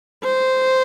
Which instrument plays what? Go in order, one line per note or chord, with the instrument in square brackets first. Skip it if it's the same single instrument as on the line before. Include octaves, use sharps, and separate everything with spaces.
[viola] C5